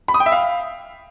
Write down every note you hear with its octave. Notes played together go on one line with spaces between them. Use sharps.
B5
D#6
G5
E5
F5